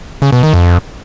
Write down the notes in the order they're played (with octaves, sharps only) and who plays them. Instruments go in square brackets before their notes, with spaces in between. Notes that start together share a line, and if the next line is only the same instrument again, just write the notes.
[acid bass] C#3
B2
D#3
F2